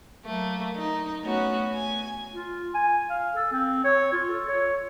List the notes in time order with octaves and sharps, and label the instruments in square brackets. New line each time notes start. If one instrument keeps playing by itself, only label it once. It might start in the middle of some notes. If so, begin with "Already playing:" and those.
[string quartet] F#3 A3 A#3
D#4
A3 B3 C#4 F#4
G#5
[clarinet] F4
G#5
F5
A4
C4
C#5
F4
A4
C#5